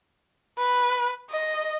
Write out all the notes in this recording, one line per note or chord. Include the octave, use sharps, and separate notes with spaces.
B4
D#5